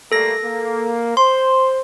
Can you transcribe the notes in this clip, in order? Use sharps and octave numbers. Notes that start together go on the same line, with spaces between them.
G3 A3 A#3 A4 A#6
A#3
C5 C6